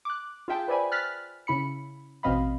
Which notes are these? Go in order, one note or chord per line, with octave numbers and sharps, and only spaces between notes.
D6 F#6
F4 G#4 E5 G5 A5
B4 C5 D5 E5 G#5 B5
F6 F#6 A6 B6
C#3 E4 B5 C#7
A1 B2 C4 D#5 F5 B5